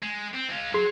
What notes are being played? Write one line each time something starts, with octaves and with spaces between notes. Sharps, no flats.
G#3
C4
G#3 F4
F#3 G#4 C6 C7